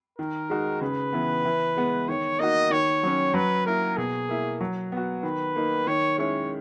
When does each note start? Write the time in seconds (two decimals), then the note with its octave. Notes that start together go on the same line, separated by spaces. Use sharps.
0.18 D#3 A#4
0.50 G#3 D#4 F#4
0.81 C#3 B4
1.13 E3 B3
1.45 E3
1.77 G#3 B3
2.08 D#3 C#5
2.39 A#3 D#4 F#4 D#5
2.70 D#3 C#5
3.03 F#3 C#4
3.34 F#3 B4
3.66 A#3 E4 A#4
3.97 B2 G#4
4.29 A#3 E4
4.61 F#3
4.92 B3 F#4
5.23 D#3 B4
5.56 A#3 D#4
5.87 D#3 C#5
6.18 G#3 C#4 E4 C#5